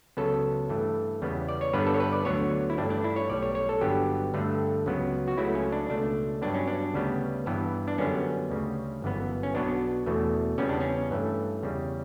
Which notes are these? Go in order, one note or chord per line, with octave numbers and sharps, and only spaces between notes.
C#2 C#3 F#3 B3 A4
G2 E3 A3
E2 C#3 G3 B3
D5
C#5
G2 D3 G3 B3 B4
A4
C#5
B4
D5
D2 D3 F#3 B3 C#5
E4
G2 E3 A3 D4
D4
E4
C#5
B1 A2 G3 D5
C#5
C#5
A4
G1 G2 D3 F#3 B3 G4
G2 D3 A3
C#2 C#3 F#3 B3
F#4
C#2 C#3 F#3 A3 E4
C#4
D4
C#2 B2 A3 D4
G2 F#3 B3 D4
C#4
D4
D2 C#3 G3 B3
G2 E3 B3
D4
F#2 D3 G3 B3 C#4
D2 C#3 G3
G1 F#2 E3 B3
C#4
B1 B2 F#3 B3 D4
E2 B2 A3
E2 C#3 G3 B3 C#4
D4
C#4
G2 E3 A3
E2 C#3 G3